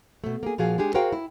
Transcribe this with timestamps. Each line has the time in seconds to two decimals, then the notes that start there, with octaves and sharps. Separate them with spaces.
0.24 B2 A3
0.43 A#3 G#4
0.58 A#2 F3 F#4 G#4 F5
0.78 G#3 D4 G4 G#4
0.94 F#4 G#4 A#4 C5 F5 G5
1.13 E4